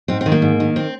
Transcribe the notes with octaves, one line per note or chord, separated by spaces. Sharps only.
G#2 C4
C4
D#3
A#3
G#2
D#3
C4